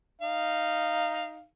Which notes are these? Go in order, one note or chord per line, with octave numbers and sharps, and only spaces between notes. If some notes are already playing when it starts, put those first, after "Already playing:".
D#4 F5